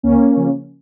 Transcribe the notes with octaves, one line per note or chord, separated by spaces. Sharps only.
C#2 A#3 C#4
C#3 F3